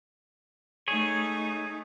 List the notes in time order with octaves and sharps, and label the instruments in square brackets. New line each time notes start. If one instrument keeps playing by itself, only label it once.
[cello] A3 D#4 [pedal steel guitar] G#4 C#5